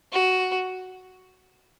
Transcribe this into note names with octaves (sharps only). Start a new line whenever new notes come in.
F#4